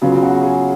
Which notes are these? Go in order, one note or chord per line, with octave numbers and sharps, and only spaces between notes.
C#3 F#3 B3 F4
F#4
G#4